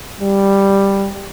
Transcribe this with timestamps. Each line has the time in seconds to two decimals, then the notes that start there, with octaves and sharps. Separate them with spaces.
0.20 G3